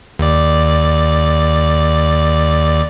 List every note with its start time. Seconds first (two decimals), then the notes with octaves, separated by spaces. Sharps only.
0.19 D#2 D5